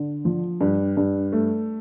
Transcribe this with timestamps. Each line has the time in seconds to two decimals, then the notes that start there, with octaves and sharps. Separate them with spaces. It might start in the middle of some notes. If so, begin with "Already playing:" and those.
Already playing: D3
0.25 F3
0.61 G2
0.97 G2
1.32 A3